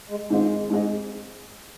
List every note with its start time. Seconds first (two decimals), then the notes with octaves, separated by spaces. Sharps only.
0.10 G#3
0.30 G#2 D#3 G#3 C4 F4
0.70 G#2 G#3 C4 G#4 D#5